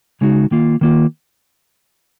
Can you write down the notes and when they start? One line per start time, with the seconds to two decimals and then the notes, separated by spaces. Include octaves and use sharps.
0.21 C#3 G#3 D#4 F#4
0.51 D#3 A#3 F4
0.81 D#3 A#3 F4